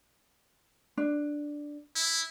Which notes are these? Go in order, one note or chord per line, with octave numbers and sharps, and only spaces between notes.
D4
E4